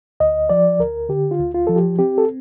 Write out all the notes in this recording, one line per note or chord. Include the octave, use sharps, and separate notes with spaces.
D2 D#5
F3 D5
D2 A#4
D3 G4
F4
D2
F4
F3 A4
G4
C4 G4
A4